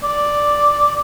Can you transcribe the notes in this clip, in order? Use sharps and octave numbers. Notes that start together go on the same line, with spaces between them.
D5